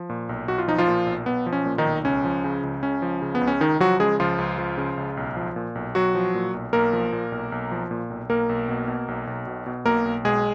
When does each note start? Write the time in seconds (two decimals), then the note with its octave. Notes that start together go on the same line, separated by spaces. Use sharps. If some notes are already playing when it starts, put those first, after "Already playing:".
Already playing: F3
0.10 A#2
0.29 B1
0.48 B1 F#4
0.58 F4
0.68 F3 D#4
0.78 F3 F4
0.87 A#2
1.07 B1
1.26 B1 B3
1.46 F3
1.53 C#4
1.66 A#2
1.78 D#3 D#4
1.86 B1
2.05 C#2 C#4
2.24 F3
2.44 C#3
2.63 C#2
2.83 C#2 C#4
3.02 F3
3.22 C#3
3.35 B3
3.41 C#2
3.47 C#4
3.61 C#2 D#3 D#4
3.80 F3 F#3 F#4
4.00 C#3 G#3 G#4
4.20 C#2 F3 F4
4.38 C#2
4.58 F3
4.78 C#3
4.98 C#2
5.17 B1
5.37 F3
5.56 A#2
5.75 B1
5.95 B1 F#3 F#4
6.15 F3
6.35 A#2
6.54 B1
6.73 B1 A#3 A#4
6.93 F3
7.12 A#2
7.32 B1
7.52 B1
7.71 F3
7.91 A#2
8.10 B1
8.30 B1 A#3 A#4
8.49 B1
8.68 B2
8.88 B2
9.08 B1
9.27 B1
9.47 B2
9.66 B2
9.85 B1 A#3 A#4
10.05 B1
10.25 B2 G#3 G#4